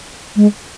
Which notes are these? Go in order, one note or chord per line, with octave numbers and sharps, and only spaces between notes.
G#3